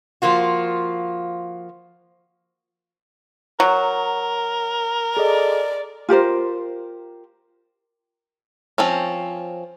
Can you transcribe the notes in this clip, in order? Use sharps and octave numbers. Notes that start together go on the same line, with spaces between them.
F3 A#3 F4 F#4
F#3 A#4
G#4 A4 D5 D#5
F4 G4 A#4 C5
F3 C4 C#4